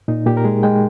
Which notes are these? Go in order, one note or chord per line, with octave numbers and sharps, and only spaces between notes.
A#2 D#4
A#2 G4
A#4
G#3 G#4
G#3 G5